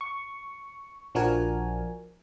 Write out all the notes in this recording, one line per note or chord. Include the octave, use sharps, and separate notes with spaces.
C#6
A#1 F3 D4 F#4 A#4 G#5